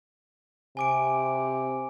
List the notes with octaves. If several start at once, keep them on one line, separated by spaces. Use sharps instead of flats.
C3 G#5 D6 D7